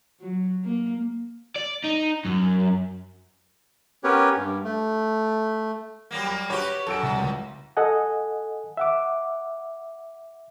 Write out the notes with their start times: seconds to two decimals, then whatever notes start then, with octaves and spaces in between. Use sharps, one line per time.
0.20 F#3
0.63 A#3
1.56 D5
1.85 D#4
2.25 F#2
4.04 B3 C#4 G4 A#4 B4 C#5
4.37 G2
4.64 A3
6.11 F#3 G3 A#3
6.27 B5
6.50 F#4 G4 B4 C#5 B5 D6
6.87 F#2 A4 E6 D7
7.03 C2
7.19 C#2
7.77 A4 D#5 F#5 G#5
8.77 E5 F#5 D6